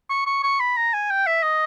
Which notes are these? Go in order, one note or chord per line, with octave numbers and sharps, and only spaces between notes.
C#6
C#6
C#6
B5
A#5
G#5
G5
E5
D#5